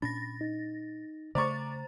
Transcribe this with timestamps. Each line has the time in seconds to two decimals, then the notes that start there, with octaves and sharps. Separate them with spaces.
0.02 A#2 C#4 D4 B5 A6 A#6
0.41 D#4
1.35 C#3 A3 C5 D5 A#5 C#6 A6